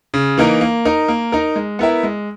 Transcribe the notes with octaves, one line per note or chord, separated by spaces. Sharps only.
C#3
E3 A#3 D#4 A#4
A#3
D#4 A#4
A#3
D#4 A#4
G#3
B3 E4 A#4 E5
G#3